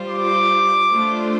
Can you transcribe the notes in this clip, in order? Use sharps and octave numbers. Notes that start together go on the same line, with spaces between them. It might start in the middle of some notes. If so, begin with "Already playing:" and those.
Already playing: G3 F4 C5
D6
A3 D4 F4 C5